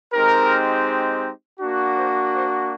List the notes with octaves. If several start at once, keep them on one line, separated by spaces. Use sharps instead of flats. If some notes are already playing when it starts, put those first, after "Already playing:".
G#3 C4 D#4 G4 A#4
A#3 D4 F#4
C5
C5